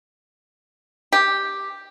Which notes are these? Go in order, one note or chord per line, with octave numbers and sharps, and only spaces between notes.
G4